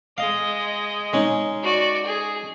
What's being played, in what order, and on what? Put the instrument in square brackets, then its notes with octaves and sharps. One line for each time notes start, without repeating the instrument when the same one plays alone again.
[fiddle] G#3 D#5 [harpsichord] F5
[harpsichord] G#3 C#4 D#4
[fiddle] F#4 D5
G#4